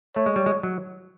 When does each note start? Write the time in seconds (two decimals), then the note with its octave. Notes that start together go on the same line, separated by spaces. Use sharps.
0.16 A3 C#5
0.26 G#3
0.36 G3
0.46 G#3
0.63 F#3